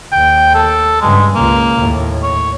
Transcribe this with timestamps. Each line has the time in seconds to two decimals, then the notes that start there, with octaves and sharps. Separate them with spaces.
0.12 D#2 G5
0.54 A4
1.02 G2 C#3 G#3
1.35 C#2 A#3
1.78 D#2 A2
2.23 C#5